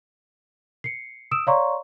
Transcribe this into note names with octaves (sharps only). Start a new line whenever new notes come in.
C7 C#7
D#6 E6 D7 E7
C#5 D5 F5 A#5 C6 C#6